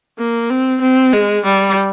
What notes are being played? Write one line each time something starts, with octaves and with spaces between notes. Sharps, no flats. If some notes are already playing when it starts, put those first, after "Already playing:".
A#3
C4
C4
G#3
G3